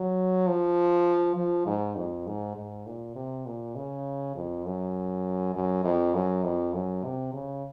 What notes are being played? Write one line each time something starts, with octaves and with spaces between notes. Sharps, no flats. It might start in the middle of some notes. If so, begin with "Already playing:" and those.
Already playing: F#3
F3
F3
G#2
F2
G#2
G#2
A#2
C3
A#2
C#3
F2
F#2
F#2
F2
F#2
F2
F#2
C3
C#3